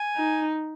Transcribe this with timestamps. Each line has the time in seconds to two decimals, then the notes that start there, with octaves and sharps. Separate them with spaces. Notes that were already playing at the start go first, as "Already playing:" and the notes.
Already playing: G#5
0.16 D#4